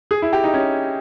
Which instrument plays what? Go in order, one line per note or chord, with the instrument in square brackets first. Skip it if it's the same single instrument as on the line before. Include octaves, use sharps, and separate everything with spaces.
[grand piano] G#4
E4
G4
D#4
C#4